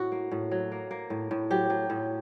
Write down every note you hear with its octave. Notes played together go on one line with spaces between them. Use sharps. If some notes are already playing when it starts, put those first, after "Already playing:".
Already playing: A2 F#4
A#3
A2
F#3
A#3
A#3
A2
A2
F#3 G4
F#3
A2